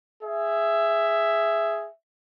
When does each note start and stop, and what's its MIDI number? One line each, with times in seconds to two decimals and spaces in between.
0.23 1.88 68
0.23 1.88 76